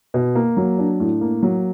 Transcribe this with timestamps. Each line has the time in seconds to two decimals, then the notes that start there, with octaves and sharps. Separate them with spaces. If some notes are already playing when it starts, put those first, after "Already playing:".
0.14 B2
0.35 A#3
0.57 F#3
0.79 D4
1.00 A2
1.21 A#3
1.43 F#3